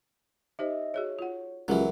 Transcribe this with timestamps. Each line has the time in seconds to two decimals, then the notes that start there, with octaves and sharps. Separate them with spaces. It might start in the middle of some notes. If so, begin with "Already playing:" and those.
0.59 D#4 G4 C5 D#5 E5
0.94 F#4 G#4 C#5 E5
1.19 F4 F#5
1.68 C#2 E3 F#3 G4 G#4 A#4